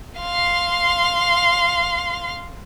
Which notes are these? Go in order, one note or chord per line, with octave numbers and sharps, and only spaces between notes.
F5 C6